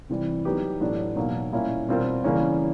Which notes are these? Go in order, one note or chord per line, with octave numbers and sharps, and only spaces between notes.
C3 E3 G3
F#3 B3 D#4 G4 B4
A2 F#3 B3 D4
B2 F#3 A#3 D#4
A#2 G3 A#3 C#4 E4
B2 G3 C4 F4 A#4
C#3 E3 G3 A#3 C#4